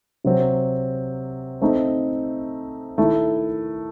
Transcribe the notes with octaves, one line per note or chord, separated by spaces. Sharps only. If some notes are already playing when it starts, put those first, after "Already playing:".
C3 F#3 C4
A3 C4 D#4 A4
D#3 A3 E4